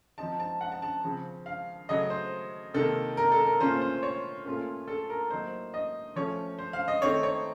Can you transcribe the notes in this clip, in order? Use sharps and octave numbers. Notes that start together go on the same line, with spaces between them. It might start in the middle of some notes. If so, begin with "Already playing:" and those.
F3 C4 D#4 A5
A5
F#5
A5
A5
C#3 F3 C4
F5
C#3 F#3 A3 D#5
C5
C3 D#3 A#3 A4
A#4
A4
A#4
A#2 A3 C#4 F4 C5
C5
C#5
A#2 A3 C#4 F4
A4
A#4
A2 F#3 A#3 D#4 C5
D#5
F3 A3 C#4 C#5
C5
F5
D#5
D#3 A3 C4 D#4 C#5
C#5